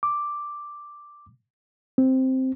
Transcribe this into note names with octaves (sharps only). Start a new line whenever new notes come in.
D6
C4